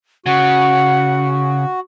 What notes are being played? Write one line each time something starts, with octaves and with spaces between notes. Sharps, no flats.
C#3 F#4 F#5